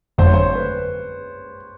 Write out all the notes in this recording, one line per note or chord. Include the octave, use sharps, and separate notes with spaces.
G1 F2 D3 F#3 A3 C5
C#5
C5
B4